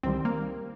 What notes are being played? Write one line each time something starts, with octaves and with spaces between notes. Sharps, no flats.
C2 C3 D#3 G3 C4
A#3